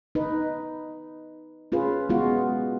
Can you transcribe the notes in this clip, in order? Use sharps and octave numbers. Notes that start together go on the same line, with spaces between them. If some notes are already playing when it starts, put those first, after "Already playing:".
D#4 B4
C#4 F4 G#4 B4
G#3 B3 F4 F#4